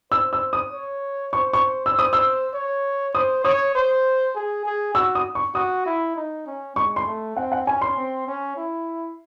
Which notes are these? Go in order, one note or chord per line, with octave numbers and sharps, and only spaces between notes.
C5 E6
E6
D#6
C#5
C5 C#6
C#6
E6
C5
D#6
E6
C#5
C5 D#6
C#5 D#6
C5
G#4
G#4
F#4 E6
D#6
C#6
F#4 D#6
E4
D#4
C#4
G#3 C#6
C6
A3
C4 F#5
F#5
C#4 G#5
C6
C4
C#4
E4